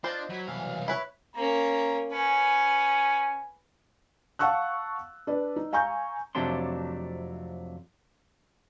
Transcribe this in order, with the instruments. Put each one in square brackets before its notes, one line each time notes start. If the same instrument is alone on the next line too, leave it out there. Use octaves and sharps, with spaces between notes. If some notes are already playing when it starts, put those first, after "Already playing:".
[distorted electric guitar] D4 [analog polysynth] F4 D5 D#5 [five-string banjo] C5
[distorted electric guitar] F#3 [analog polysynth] B5 G#6 B6
[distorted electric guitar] C2 F5 [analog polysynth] B2 E3 F#3
[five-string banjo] E4 B4 C#5
[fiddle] A#3 C#4 [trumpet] A#5
[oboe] C#4 [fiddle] B4 [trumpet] G#5
[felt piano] F5 F#5 A5 C#6 E6 F#6
D4 B4 D5
D#4
F5 G#5 A#5 C#6 G6
[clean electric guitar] F2 C3 F#3 A3 D4 C6